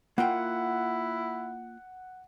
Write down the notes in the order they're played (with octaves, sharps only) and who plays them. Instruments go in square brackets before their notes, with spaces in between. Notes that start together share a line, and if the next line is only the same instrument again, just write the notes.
[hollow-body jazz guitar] A#3 F4 G5 [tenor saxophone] E4 [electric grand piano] F#5